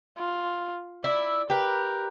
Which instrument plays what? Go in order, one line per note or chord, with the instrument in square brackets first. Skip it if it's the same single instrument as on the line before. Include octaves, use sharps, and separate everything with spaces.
[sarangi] F4
[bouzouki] E4 [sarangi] D5
[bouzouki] G4 B4 [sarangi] A#4